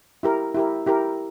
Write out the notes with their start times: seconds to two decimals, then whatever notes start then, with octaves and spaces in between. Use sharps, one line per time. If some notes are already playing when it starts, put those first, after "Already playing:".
0.23 E4 G4 A#4
0.55 E4 G4 A#4
0.86 E4 G4 A#4